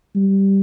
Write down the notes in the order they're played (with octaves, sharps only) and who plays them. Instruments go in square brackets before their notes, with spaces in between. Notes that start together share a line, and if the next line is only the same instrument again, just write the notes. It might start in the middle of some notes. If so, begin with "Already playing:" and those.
[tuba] G3